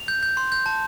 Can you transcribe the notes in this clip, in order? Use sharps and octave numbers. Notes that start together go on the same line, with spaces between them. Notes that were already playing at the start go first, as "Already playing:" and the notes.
Already playing: F7
G6
G6
C6
G6
A5